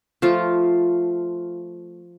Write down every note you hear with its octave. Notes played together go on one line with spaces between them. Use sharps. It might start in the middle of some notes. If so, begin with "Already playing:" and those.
F3 A3 F4